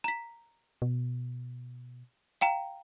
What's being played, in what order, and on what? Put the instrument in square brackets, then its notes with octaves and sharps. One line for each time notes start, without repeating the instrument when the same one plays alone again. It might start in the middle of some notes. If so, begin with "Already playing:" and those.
[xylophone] A#5 B6
[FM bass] B2
[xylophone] F5 G5 A#5